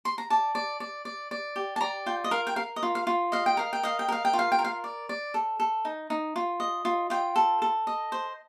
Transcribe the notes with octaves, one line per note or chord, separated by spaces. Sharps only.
C6
A#5
D5 A5
D5
D5
D5
D5
G4
A5
D5 A#5
F4 G5
D#5
A#4 F5
G5
A#4 F5
D#5
F4
F5
F4
D#5 F5
G5
A#4 F5
G5
D#5 F5
G5
A#4 F5
G5
F4
F5
G5
A#4
F5
D5
D5
A4
A4
D#4
D#4
F4
D#5
F4
F4 G5
A4
A4
D#5
C5